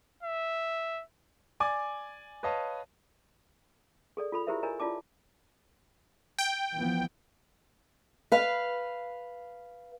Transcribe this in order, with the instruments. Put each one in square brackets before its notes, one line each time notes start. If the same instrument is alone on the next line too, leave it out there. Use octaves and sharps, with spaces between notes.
[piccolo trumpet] E5
[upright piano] D5 G#5 D6
B4 C#5 D#5 F5 A5
[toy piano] G#4 A4 D5
F4 A4 B5
E4 G4 G#4 A#4 C5 E5
A#4 C#5 D#5 G#5 A#5
E4 F4 D5 A5 D6
[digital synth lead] G5
[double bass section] E3 F3 B3
[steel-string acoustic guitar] B4 F5